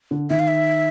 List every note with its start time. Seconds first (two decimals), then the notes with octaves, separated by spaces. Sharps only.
0.11 D3
0.30 D#3 E5
0.40 F5
0.48 E5